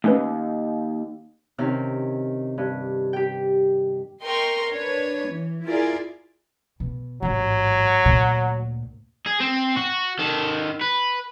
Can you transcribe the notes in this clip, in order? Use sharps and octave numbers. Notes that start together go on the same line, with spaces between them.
D#2 A3 C#4 B4
C3 D#3 C#4 F6
G2
G4 G5
A#4 D#5 G5 C6 C#6
D4 B4 C#5
E3
E4 F4 G#4 A#4 D5
B2
A1 G#2 F#3
D2 A#2
G#4
C4
F#4
D#3 A4
B4